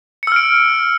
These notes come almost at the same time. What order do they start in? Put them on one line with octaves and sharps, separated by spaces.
C#7 E6 F6 D7